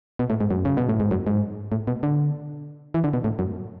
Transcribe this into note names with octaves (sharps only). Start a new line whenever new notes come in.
B2
A2
G#2
F#2
C#3
B2
A2
G#2
F#2
G#2
A2
B2
D3
E3
D3
B2
A2
F#2